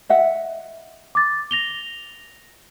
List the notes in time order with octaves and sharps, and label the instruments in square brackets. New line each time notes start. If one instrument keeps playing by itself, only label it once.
[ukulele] D#5 E5 F#5
[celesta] D6 A6
A#6 F7 G7